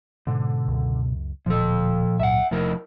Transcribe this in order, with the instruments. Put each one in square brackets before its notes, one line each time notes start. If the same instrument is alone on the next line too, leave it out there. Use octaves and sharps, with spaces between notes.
[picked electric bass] G#2 [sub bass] B2 [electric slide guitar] D3
[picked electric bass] C#2 F#2
[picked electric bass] D1 D2 [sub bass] A#2 [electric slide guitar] F3 A4
[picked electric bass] C#2 G#2 F#3 [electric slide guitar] E5 F#5
[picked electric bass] E1 C3 A3 [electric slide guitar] F3 E4 A#4